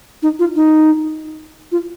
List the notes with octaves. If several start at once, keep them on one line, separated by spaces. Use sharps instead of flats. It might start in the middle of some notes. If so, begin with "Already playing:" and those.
D#4
F4
D#4
F4